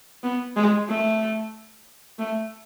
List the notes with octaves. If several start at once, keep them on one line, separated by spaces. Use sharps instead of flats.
B3
G#3
A3
A3